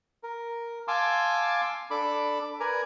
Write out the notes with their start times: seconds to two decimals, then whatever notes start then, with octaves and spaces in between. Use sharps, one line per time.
0.23 A#4
0.88 F5 G#5 A5 C6 D6 E6
1.91 D4 A4 B5 D6
2.60 A#4 B4 D5 G#5 A#5